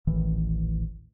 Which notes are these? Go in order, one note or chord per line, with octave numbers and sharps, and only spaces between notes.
D#1 A1 D#3 E3